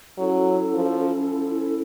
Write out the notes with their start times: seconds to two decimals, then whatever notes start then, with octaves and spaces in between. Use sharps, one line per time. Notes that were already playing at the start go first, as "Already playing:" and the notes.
0.18 F#3 C#4 E4 A4
0.74 F3